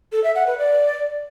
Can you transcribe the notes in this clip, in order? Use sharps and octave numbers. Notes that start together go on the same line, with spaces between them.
A4
E5
F#5
B4
D5